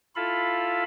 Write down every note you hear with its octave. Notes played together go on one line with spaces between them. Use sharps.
E4 F4 A4 F5 B5